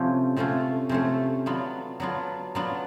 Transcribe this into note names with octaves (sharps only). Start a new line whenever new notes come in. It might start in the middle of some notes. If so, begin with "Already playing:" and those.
Already playing: C3 F3 A3 C#4 F4
C3 F3 A3 C#4 F4
C3 F3 A3 C#4 F4
F#3 B3 D4 F4
F#3 B3 D4 F4
F#3 B3 D4 F4